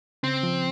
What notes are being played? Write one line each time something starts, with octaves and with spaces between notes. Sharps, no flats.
C#3 C4
F3